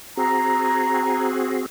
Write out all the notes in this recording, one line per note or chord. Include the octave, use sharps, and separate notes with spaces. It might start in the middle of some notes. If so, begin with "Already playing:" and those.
C4 F#4 G#4 A#5